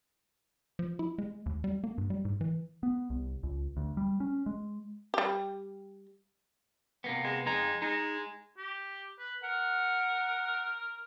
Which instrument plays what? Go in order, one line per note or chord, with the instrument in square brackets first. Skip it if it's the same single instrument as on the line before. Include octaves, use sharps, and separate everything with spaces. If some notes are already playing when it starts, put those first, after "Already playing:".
[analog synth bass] F3
E4
G#3
D#2
G3
A#3
G2
G3
G#2
E3
[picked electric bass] B3
C2
C#2
D2
G3
C#4
G#3
[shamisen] G3 G4
[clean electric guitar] C3 A#3 B3
[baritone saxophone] G#3
[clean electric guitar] F2 D#4 A#5 [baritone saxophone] G#3
[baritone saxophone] G#3 [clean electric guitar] D#4
[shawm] G4
B4
[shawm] A#4 [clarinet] F#5